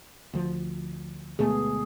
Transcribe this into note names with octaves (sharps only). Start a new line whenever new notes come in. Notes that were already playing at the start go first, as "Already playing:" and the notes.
D2 F3
D2 B2 G#3 A3 B3 G#4